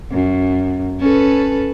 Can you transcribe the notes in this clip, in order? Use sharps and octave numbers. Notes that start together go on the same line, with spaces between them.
F#2
C#4 A4 B4